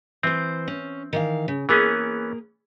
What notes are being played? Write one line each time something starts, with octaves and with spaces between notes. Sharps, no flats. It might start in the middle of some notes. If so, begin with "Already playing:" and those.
E3 C4 C5
C#4
D#3 E3 F5
C#3
E3 A#3 B3 C#4 G#4 A#4